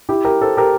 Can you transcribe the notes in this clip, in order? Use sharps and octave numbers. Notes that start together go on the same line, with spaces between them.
E4 G4
G4 A#4
A4 C5
G4 A#4